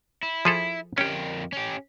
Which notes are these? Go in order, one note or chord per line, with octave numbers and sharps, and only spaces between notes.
E4
F3 G#4 A4
F2 C#4 G4 A#4 G5
C#4 G4